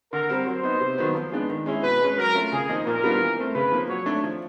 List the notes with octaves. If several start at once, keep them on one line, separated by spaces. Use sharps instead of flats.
D3 A#4
G3 C4
F#3 C5
B3 D#4
C3
D#3 F#3 B3
F3
G#3 B3 D4
D#3
G#3 C#4 E4
B2 B4
G#3 C#4
F#3 A#4
A3 C#4 F4
C#3 G#4
F3 A#3 D#4
A#2 A#4
G3 B3 D4 F4
E3
A3 C4
C#3 B4
F3 A#3
F#3 C#5
A3 D4
F3